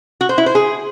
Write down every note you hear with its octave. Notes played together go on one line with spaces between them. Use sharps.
F#4
C5
E4
C5
G#4